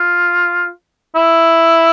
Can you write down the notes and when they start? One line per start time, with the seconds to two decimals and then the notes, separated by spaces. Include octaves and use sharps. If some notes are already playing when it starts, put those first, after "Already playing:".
Already playing: F4
1.15 E4